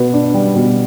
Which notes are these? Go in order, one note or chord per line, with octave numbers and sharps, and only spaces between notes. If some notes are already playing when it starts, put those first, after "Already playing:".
Already playing: B2 B3
D4
G3
B2